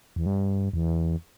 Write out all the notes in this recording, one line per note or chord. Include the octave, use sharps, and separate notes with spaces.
E2
G2
E2